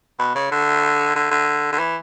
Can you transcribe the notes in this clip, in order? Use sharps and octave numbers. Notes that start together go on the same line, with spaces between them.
B2
C#3
D3
D3
D3
D3
E3